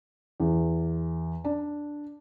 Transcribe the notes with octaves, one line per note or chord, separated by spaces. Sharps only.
E2
D4